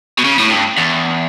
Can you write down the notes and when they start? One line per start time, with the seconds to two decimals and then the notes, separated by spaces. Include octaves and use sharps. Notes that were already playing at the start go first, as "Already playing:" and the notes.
0.19 B2
0.25 C#3
0.39 A2
0.51 G2
0.78 E2